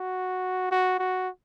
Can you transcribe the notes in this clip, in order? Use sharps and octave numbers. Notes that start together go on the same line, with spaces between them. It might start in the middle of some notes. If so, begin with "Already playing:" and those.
Already playing: F#4
F#4
F#4